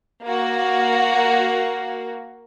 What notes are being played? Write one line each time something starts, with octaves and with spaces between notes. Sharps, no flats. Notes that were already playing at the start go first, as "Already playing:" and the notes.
A#3 F#4